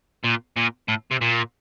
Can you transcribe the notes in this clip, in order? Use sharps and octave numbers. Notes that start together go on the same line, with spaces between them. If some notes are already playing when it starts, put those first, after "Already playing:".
A#2
A#2
A2
C3
A#2